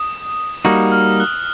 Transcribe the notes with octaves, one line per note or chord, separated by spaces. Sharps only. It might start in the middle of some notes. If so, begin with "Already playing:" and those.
Already playing: D#6
G3 A#3 D#4 F#4 E6
F6
F#6